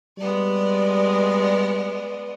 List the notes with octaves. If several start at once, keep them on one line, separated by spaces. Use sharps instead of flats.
G3 G#3 B3 D5